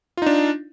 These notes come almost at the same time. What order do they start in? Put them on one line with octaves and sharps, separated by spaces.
F4 D#4 D4